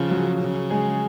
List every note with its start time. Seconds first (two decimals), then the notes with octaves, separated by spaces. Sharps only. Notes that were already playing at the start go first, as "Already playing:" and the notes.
Already playing: C#3 F3 F4
0.11 F#3 F#4
0.41 C#3
0.71 G#3 G#4